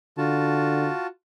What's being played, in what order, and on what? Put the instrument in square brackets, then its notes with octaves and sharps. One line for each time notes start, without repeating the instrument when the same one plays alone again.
[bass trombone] D3 [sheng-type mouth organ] F4 F#4 A5